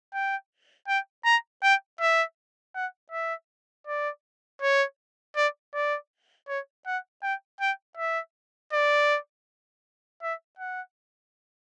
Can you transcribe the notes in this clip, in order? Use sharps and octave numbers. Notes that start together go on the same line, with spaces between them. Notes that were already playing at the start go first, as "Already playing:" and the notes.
G5
G5
A#5
G5
E5
F#5
E5
D5
C#5
D5
D5
C#5
F#5
G5
G5
E5
D5
E5
F#5